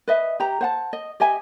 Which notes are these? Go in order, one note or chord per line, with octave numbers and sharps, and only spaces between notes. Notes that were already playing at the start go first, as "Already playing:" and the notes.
B4 D#5 E5
G4 A#5
C5 F#5 A5
D#5
G4 D#5 E5 G#5